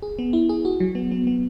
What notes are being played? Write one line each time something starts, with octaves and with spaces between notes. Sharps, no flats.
G#4
B3
E4
G#4
F#4
F#3
B3
B3
B3